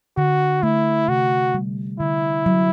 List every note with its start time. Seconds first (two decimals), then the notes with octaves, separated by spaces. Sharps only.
0.17 D3 F#4
0.63 A3 E4
1.08 C3 F#4
1.54 G3
2.00 D3 E4
2.46 F#3